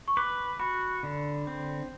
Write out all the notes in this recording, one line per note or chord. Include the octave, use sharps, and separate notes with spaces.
C#6
B4 D6
F#4 B5
D3
C4